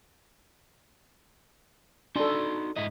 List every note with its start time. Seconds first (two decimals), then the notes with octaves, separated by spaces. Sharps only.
2.16 D4 D#4 F#4 A4 C6
2.76 G#2 E4 D#5